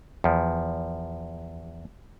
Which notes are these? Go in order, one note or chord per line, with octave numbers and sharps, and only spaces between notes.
E2 F3